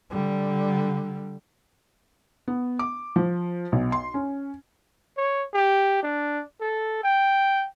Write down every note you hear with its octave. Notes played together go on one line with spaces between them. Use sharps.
D3 G3
B3
D6
F3
B1
C6
C#4
C#5
G4
D4
A4
G5